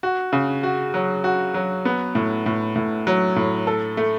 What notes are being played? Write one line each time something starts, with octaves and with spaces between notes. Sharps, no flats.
F#4
C#3
F#4
F#3
F#4
F#3
B3
A2
A2
A2
F#3
A2
A4
A3